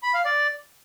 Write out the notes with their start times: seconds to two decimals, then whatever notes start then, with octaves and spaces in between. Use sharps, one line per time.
0.03 B5
0.14 F5
0.25 D5